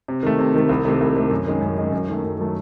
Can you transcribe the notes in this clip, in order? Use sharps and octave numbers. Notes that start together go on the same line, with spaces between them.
C3
D#3 A3
C3
D#3 A3
C2
C3 D#3 A3
C2
C3 D#3 A3
F#2
D#3 G#3 C#4
F#2
D#3 G#3 C#4
F#2
D#3 F#3 A3
F#2
D#3 F#3 A3